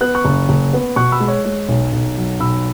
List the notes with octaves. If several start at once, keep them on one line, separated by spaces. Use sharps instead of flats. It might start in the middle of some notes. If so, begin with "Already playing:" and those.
B3 F#6
C#6 F#6
F#1
F#1
B3
B2 C#6 F#6
B5 E6
G#3
C#5
G#3 C#5
B1
B1
F#3
B1 B5 E6